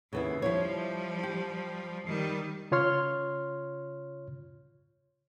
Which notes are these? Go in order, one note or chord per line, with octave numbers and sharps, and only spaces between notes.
D#2 C#3 B3 E4
F3 G3 E4 F4 C#5
G4
D#3 G3
C#3 F4 C#5 C6 F6